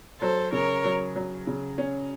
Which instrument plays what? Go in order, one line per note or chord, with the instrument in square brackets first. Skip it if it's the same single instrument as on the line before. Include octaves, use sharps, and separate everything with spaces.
[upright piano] F#3 [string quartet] A4 C5
[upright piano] C#3 [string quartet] A#4 C#5
[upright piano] F#3
F#3
C#3
C#4